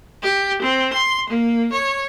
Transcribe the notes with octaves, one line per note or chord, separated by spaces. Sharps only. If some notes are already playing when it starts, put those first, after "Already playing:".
G4
C4
C6
A#3
C#5